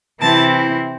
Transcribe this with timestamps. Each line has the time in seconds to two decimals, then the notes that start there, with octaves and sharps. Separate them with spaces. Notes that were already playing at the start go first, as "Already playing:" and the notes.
0.21 C3 E3 C4 E4 A5